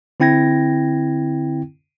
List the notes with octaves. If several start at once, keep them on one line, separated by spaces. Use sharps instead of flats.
D3 C4 E4 G5 G#6 A#6